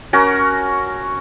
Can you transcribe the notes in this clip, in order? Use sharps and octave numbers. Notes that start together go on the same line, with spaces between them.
C#4 F#4 A#4 A#5